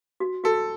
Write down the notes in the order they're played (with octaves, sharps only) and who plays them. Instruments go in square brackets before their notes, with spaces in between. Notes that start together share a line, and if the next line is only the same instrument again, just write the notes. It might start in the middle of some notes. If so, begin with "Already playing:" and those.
[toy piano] F#4
[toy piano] F#4 [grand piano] A4